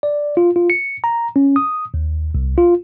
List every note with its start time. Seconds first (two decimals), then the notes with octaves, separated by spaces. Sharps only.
0.03 D5
0.37 F4
0.56 F4
0.70 C#7
1.04 A#5
1.36 C#4
1.56 D#6
1.94 D#2
2.35 C2
2.58 F4